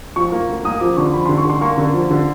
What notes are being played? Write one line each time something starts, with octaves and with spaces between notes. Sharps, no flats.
F3 C#6
A#3
D2
A#3 D#6
F3 D6
D3 C#6
F3 B5
D3 C6
C#6
D3 C6
A#3 C#6
D3
F3
D3